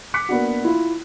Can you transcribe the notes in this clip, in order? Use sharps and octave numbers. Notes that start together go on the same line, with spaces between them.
D6 F#6 B6 C#7
A#3 B3 D4 F#4
E4 F4